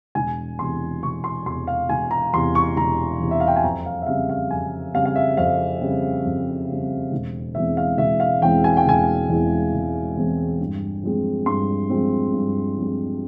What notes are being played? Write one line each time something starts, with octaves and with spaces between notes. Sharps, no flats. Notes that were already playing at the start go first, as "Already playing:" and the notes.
E1 G#5
E2 C3 C6
E1 C#6
C6
E2 C3 C6
F5
E1 G#5
A#5
E2 C3 C6
C#6
E1 A#5
E2 C3
E5
F5
G5
G#5
F2 A#5
F5
E5
C#3 G3 C4 F5
F5
F2 G#5
C#3 G3 C4 F5
F5
E5
F2 F5
C#3 G3 C4
F2
C#3 G3 C4
E1
E2 E3 G#3 C4 E5
F5
E1 E5
F5
E2 E3 G#3 C4 G5
G#5
G5
E1 G#5
E2 E3 G#3 C4
E1
E2 E3 G#3 C4
G2
F3 G#3 C4
G2 C6
F3 G#3 C4
G2
F3 G#3 C4